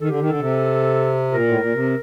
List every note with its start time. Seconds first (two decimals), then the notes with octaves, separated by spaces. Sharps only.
0.01 D#3 A4
0.09 D3 G4
0.20 D#3
0.30 D3 A4
0.40 C3
1.32 A#2 A#4
1.47 A2
1.60 A#2
1.73 C3